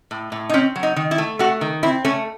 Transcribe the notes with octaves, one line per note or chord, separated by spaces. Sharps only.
A2
A2
D#4
C4 C#4
F#3
D#4
D#3
E4
A3
A3 F#4
D#3
C4 E4
A3 C#4